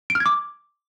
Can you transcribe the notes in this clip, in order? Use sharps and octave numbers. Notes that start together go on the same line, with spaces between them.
D7
F6
G#6
D6